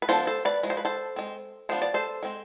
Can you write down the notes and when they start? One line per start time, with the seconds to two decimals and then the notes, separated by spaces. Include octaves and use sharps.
0.02 B4
0.09 F3 B3 D4 A4 C5
0.27 A4 C5
0.45 B4 D5
0.63 F3 G#3
0.70 C5
0.77 B4
0.85 A4 C5
1.16 G#3 C4
1.69 F3 B3 D4 C5
1.82 D5
1.94 A4 C5
2.23 G#3 C4